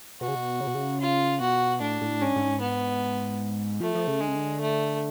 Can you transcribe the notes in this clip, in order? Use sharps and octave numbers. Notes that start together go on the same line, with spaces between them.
B2 F#4
C#3
B2
C#3
B2
C#3
F4
B2 F#4
A2 D4
A2
G#2 C#4
G#2
B3
F3 A3
F3
C#3
D3 G#3
C#3
D3
A3